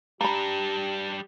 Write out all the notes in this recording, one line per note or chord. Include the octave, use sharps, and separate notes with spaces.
G3 D4 G4 A#5 B5